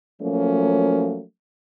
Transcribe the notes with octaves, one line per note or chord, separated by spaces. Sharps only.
F3 F#3 A3 A#3 C#4